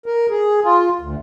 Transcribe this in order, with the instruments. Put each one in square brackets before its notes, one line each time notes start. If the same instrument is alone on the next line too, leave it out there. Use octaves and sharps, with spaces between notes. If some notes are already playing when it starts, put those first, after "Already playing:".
[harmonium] A#4
G#4
F4
D2